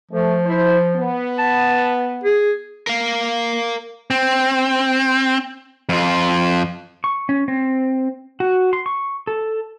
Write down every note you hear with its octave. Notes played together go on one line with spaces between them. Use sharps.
F3 A3
E4 C5
B3
A5
G#4
A#4 F5
C4
F2 F4
C#6
C#4
C4
F#4
C6
C#6
A4